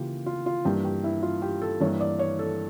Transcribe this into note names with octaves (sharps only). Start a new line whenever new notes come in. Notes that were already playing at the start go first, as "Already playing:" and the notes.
Already playing: C#3 E3 A#3 F4 G4
F4
F4
G2 E3 A#3 G4
G4
E4
F4
G4
A4
G2 E3 A#3 C#5
D5
C#5
A4